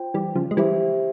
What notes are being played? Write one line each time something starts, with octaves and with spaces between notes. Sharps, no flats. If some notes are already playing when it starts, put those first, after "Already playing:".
Already playing: F4 C5 G5
E3 G3
C#3 F3
G#3
E3 G3 G4 C5 E5